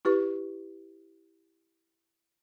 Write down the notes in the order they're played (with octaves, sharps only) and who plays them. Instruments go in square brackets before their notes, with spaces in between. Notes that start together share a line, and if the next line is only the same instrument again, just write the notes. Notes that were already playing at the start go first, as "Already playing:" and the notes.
[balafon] E4 G4 B4 C#6